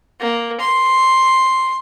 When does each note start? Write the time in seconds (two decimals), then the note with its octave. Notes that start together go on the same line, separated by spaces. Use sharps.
0.20 A#3
0.60 C6